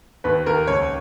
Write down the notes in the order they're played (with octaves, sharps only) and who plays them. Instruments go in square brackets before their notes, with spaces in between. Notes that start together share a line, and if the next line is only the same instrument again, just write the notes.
[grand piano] D#2 B4
D#2 A#4
C#2 C#5